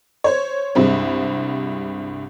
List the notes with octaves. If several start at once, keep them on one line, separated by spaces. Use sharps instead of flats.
C5 C#5
C2 G2 G#3 C4